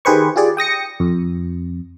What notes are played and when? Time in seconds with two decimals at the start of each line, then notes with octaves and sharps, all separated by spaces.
0.05 D#3 G4 G#4 B4 C5 C#6
0.36 F4 G4 G#4 D5
0.57 G5 D#6 A#6 C#7
1.00 F2